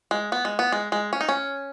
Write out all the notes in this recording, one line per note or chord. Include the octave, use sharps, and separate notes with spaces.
G#3
B3
G#3
B3
G#3
G#3
C#4
D#4
C#4